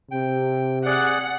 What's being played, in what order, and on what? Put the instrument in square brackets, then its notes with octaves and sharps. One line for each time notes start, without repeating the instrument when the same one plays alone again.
[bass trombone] C3 [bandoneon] G5
[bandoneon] G#4 D5 [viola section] F#5